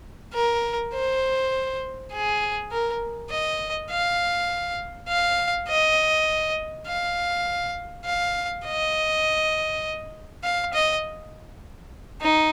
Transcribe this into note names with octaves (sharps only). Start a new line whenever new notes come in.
A#4
C5
G#4
A#4
D#5
F5
F5
D#5
F5
F5
D#5
F5
D#5
D#4